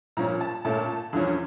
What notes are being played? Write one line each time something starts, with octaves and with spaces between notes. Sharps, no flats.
A#2 F3 C#4 A#5
A5
A#2 A3 C#4 A5
E2 D3 F3 C#4